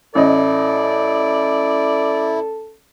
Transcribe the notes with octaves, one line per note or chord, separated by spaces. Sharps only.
A1 E4 A4 D5 D#5